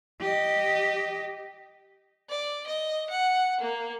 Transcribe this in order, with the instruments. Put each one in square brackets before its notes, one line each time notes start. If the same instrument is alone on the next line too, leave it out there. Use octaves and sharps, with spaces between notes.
[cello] G4 D#5
[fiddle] D5
D#5
F#5
A#3